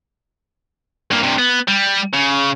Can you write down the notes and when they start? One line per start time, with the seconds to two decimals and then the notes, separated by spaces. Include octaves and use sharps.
1.11 G2 A#3
1.23 G2 C3
1.38 B3
1.68 G3
2.13 C#3